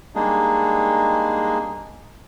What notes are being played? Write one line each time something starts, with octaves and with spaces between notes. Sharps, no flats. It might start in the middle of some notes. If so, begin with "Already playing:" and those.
G3 G#3 A#3 D4 D#4 G#4